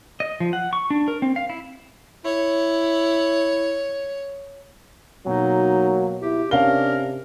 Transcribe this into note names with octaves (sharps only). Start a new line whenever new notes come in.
D#5
F3
F#5
C#6
D4
A#4
C4
F5
E4
E4 C#5
B2 F#3 A#3 D#4
E4 G4
C3 C#4 D4 A#4 F5 G7